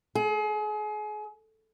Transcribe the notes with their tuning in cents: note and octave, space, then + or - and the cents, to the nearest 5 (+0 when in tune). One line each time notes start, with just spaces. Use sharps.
G#4 +35